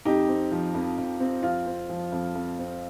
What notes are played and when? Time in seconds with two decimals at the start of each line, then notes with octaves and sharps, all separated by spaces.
0.05 F2 D#4 G4
0.28 C4
0.51 F3
0.74 F2
0.98 F2
1.20 C4
1.43 F2 F4
1.66 C4
1.89 F3
2.12 F2
2.35 F2
2.59 C4